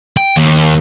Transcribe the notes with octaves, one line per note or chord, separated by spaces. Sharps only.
G5
D#2